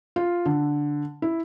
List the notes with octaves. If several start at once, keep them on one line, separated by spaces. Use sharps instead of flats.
F4
D3
E4